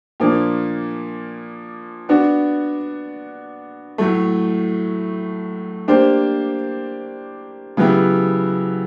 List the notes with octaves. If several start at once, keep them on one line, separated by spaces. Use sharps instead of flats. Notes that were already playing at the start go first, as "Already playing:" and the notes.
A#2 F3 A#3 D4
B3 D4 F#4
A2 F#3 A3
A#3 D4 G4 C5
C#3 F#3 B3 E4 G4